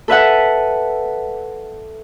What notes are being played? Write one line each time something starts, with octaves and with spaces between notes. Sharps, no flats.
A4 B4 E5 F#5